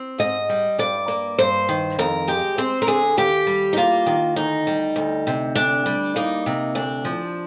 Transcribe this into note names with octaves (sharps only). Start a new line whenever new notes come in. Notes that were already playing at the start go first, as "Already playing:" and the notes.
Already playing: C4
G#2 D#5
G3
G2 D5
A#3
G2 C5
D#3
F2 A#4
G#3 G4
C4 C5
A#4
D3 G#4
D#2 G4
G3
D#4
A#3 F4
D#3
D2 D#4
G3
D2
C3
D2 D4
G3
A#3 D#4
C3
D2 D4
F3